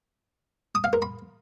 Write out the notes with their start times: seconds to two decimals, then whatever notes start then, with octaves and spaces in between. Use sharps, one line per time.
0.75 D#6
0.84 F5
0.93 A#4
1.02 B5